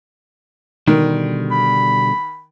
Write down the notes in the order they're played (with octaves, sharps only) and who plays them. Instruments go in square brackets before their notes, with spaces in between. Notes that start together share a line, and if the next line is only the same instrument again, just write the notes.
[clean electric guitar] B2 D3 G3 [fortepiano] D#3
[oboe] B5